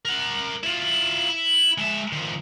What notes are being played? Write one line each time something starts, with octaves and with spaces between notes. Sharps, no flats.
A#4 F#5
E4 F4
E4
G#3 E5
D#3 F3